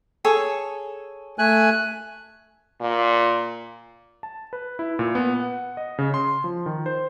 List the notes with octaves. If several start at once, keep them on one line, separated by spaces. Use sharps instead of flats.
G#4 A4 C#5
A3 G#5 F#6
A#2
A5
B4
E4
A#2
B3
F#5
D#5
C#3
C6
F3
D#3
C5